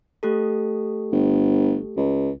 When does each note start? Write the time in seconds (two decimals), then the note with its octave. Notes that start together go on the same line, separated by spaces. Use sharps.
0.23 A3 G4 A4
1.12 G1
1.97 C#2